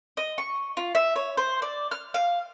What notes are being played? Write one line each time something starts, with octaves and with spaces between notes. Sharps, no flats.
D#5
C#6
F4
E5
C#5
C5
D5
F6
F5